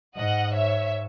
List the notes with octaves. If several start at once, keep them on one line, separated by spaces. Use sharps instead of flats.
G#2 D#5 F#5
C#5 E5